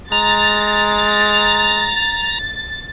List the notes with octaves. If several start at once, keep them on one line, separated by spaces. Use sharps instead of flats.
G#3 A#5 A6